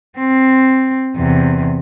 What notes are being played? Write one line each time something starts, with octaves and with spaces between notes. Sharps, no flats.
C4
E2 C3